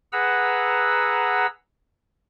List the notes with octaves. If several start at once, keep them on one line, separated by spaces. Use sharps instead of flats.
G#4 B4 F#5 A#5 E6